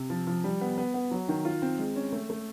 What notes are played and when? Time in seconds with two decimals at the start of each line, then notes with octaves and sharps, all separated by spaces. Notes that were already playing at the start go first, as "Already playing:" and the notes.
Already playing: C3
0.10 F3
0.27 F3
0.44 G3
0.61 B3
0.78 B3
0.94 B3
1.11 F#3
1.29 D#3
1.45 F4
1.62 C4
1.79 G#3
1.96 C#4
2.12 A3
2.30 A3